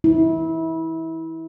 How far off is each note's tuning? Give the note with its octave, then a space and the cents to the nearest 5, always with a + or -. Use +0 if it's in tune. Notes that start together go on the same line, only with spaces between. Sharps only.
E4 -25